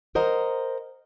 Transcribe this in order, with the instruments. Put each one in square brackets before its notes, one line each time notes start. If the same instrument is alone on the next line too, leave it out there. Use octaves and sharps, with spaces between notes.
[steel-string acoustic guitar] A#4 C5 D#5 F#5 A#5